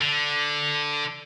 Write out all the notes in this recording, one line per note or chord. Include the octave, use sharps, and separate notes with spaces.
D3